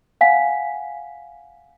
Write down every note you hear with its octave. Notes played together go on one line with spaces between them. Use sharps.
F5 F#5 G#5 B6